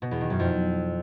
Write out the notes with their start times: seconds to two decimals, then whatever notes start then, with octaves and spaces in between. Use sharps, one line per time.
0.02 B2
0.11 E2
0.21 D#3
0.30 F#2
0.40 F2